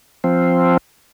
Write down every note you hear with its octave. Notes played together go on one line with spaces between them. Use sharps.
F3 C4